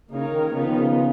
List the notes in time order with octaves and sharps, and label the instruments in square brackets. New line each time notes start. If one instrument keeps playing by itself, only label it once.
[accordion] C#3 [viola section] A#3 D#4 A#4 C#5
[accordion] D#3
[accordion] C#3 [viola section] F3 B3 D#4
[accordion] D#3
C#3